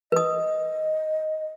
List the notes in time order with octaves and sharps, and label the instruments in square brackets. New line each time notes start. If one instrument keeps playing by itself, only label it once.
[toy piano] B4 D#6 [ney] D#5